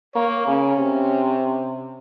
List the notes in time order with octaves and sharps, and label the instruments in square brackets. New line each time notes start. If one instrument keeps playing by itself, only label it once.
[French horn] A#3 [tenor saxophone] C#5
[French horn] C#3 [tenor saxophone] C#4
[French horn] C3